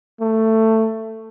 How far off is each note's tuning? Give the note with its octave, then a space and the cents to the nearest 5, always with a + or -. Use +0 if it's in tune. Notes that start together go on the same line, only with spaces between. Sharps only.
A3 +15